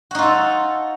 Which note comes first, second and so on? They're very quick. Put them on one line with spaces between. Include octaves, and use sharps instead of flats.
F#4 D#4 F4 A4